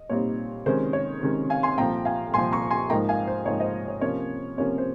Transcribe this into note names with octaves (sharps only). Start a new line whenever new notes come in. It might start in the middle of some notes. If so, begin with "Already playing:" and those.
Already playing: D#5
A#2 G3 C4 D#4 C#5
C3 D#3 G#3 C#4 C5
C#5
C3 D#3 G#3 C#4
F5 G#5
G#5 C6
C2 A#2 F3 G5 A#5
F5 G#5
C2 A#2 F3 G#5 C6
A#5 C#6
G#5 C6
G#2 F3 A#3 D#4 G5 A#5
F5 G#5
C5
G#2 F3 A#3 D#4 C#5
C5 D#5
C#5
C3 F3 A#3 C#4 C#5
C3 F3 A#3 C#4 C#5
C5